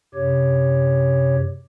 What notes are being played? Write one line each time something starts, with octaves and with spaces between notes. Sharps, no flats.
F#2 C3 G4 C#5